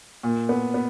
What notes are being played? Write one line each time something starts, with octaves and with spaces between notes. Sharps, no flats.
A#2
B3
B3